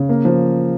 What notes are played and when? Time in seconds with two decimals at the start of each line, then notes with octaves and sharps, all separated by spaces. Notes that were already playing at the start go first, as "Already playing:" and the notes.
Already playing: C#3
0.09 A#3
0.25 F3